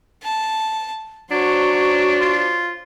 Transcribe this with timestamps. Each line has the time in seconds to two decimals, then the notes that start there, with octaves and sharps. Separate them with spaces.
0.23 A5
1.31 F#3 D4 F#4 C5 C#5
2.20 F4